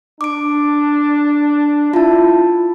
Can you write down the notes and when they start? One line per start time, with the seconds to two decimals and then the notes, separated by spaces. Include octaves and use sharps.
0.21 D4 D6 D7
1.93 E4 F4 A5